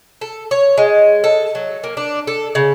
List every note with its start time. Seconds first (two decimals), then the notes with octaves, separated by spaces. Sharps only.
0.21 A4
0.51 C#5
0.78 G#3
1.24 A4
1.55 F#3
1.84 A#3
1.97 D4
2.27 A4
2.55 C#3